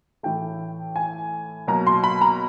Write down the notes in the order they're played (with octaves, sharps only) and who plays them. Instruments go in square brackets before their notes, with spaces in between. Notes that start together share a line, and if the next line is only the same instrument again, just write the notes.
[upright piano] A2 E3 A3 G5
G#5
B2 F#3 A#3 A#5
C6
B5
A#5